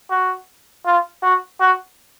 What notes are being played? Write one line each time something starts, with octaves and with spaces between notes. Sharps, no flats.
F#4
F4
F#4
F#4